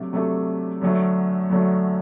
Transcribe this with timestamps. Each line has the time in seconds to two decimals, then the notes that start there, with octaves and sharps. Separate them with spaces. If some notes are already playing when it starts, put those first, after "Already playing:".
Already playing: C3 F#3 A3 D4 A4
0.13 C3 F#3 A3 D4 A4
0.81 F#2 D3 F#3 A3
1.50 F#2 D3 F#3 A3